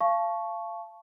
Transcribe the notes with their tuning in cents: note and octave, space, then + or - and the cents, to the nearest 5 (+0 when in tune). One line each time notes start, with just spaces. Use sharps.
F5 -25 A5 -15 C#6 +0